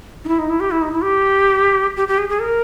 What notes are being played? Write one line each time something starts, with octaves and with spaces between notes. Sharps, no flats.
D#4
E4
D#4
E4
G4
E4
D#4
E4
G4
G4
G4
G#4
G#4
A#4